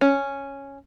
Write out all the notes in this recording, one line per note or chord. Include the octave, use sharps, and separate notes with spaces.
C#4